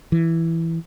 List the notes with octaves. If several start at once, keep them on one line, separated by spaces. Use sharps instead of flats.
E3